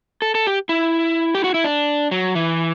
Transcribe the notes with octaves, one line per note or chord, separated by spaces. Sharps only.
A4
A4
G4
E4
G4
F#4
E4
D4
F#3
E3